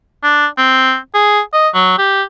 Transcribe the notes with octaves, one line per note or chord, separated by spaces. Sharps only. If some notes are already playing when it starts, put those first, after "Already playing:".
D4
C4
G#4
D#5
F#3
G4